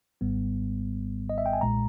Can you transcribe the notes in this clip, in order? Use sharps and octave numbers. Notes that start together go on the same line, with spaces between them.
G#1 G#2 G3 B3
D#5
E5
G5
G#5
B1 A#2 G#3 A#5